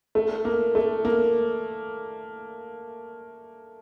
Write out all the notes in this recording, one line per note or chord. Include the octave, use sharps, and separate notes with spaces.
A3
A#3
A3
A#3